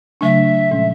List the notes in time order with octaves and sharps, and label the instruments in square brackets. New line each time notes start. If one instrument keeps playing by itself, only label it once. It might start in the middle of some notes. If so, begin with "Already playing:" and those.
[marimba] C#3 F#3 A3 D4 [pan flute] E5
[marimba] A#2 F3 G#3 C#4